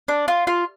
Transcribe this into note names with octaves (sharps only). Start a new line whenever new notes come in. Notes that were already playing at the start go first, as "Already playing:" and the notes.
D4
F4
F4